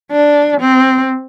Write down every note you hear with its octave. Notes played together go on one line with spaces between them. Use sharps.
D4
C4